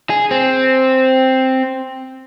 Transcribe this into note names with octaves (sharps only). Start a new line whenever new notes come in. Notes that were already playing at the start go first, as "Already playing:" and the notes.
G#4
C4